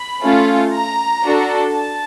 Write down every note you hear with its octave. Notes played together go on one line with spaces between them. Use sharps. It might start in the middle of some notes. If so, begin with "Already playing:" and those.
Already playing: B5
A3 C#4 F4
A#5
D4 F#4 A4
A5